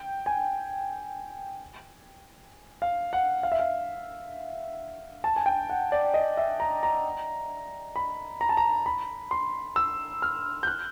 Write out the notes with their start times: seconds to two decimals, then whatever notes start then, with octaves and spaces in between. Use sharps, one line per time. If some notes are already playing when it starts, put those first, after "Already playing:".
Already playing: G5
0.26 G#5
2.82 F5
3.13 F#5
3.43 F5
3.52 E5
3.59 F5
5.24 A5
5.36 G#5
5.46 G5
5.70 F#5
5.92 D5
6.14 D#5
6.37 E5
6.60 A#5
6.83 A#5
7.96 B5
8.41 A#5
8.49 A5
8.57 A#5
8.86 B5
9.31 C6
9.76 E6
10.22 F6
10.63 G6
10.67 F#6